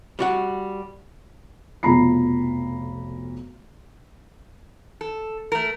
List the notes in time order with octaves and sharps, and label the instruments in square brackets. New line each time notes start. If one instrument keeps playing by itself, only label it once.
[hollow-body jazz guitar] G3 F#4 F#5
[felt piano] F1 B1 F3 A#5 B5 C7
[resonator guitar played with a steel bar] A4
A3 A#4